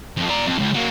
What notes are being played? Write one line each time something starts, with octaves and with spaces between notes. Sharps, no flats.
F2 F3
D5 A#5
F2
C#2
F#3 A#3